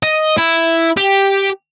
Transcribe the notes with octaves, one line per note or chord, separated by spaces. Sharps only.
D#5
E4
G4